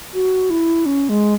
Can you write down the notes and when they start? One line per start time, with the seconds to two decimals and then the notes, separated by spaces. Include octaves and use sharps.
0.14 F#4
0.50 E4
0.86 C#4
1.09 G#3